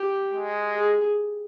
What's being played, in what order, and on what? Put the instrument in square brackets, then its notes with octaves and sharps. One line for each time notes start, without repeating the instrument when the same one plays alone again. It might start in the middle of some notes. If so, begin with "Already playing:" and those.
Already playing: [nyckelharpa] G4
[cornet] G#3
[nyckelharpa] G#4